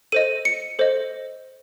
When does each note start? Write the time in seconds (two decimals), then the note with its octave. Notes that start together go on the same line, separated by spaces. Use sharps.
0.12 A4 C5 D#5 D#7
0.45 C#7
0.79 A4 C5 D#5